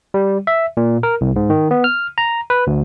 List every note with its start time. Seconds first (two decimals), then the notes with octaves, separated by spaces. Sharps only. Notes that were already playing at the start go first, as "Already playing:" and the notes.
0.14 G3
0.47 E5
0.77 A#2
1.03 A#4
1.21 C2
1.36 G#2
1.50 D#3
1.71 B3
1.84 F6
2.18 A#5
2.50 B4
2.67 D2